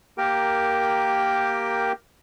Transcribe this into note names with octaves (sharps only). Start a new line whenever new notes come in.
A#3 G4 A#4 G5